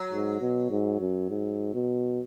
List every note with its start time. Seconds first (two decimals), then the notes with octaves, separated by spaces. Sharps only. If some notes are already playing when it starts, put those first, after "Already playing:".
Already playing: F#3
0.12 G#2
0.41 B2
0.71 G#2
1.01 F#2
1.30 G#2
1.74 B2